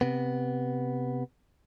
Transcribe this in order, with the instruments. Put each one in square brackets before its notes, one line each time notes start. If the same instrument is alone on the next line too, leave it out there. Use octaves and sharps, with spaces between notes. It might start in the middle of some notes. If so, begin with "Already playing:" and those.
[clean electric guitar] C3 B3